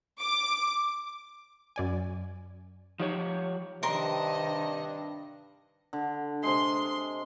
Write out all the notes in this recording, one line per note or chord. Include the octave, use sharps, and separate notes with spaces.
D6
F#2 D5 G#5
F3 D#4 G4 C#5
G2 C3 D#3 D4 A#4 D#5 C6
D3
C3 G#3 C6